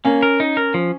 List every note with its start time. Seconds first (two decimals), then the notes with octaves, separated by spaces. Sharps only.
0.05 A#3 C#4
0.23 A#4
0.40 D#4
0.57 A#4
0.74 F3